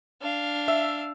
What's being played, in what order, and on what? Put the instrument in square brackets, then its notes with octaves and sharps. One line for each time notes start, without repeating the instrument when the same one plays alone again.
[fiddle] D4 F5
[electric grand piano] E5 E6